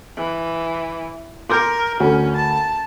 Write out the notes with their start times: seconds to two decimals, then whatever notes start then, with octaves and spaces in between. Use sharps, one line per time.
0.17 E3
1.50 A#4 C6 D6 G6
2.00 D2 C#4
2.36 A5